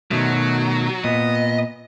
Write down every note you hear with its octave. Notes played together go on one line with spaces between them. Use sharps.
B2 D#3 F#3 A3
A#2 B3 D#5